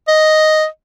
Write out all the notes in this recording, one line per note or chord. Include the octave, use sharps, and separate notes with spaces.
D#5